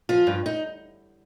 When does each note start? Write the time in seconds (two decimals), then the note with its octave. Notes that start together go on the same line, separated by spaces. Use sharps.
0.09 F3 F4
0.27 G2
0.46 D#4